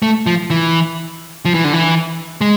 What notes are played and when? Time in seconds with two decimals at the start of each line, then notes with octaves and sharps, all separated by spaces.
0.02 A3
0.26 F3
0.50 E3
1.45 F3
1.54 E3
1.64 D3
1.73 E3
2.41 G#3